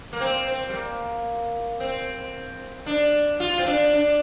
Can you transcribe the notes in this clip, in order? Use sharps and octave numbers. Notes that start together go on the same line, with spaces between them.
A#3
C4
C4
G3
A#3
C4
D4
F4
C4
D4
D4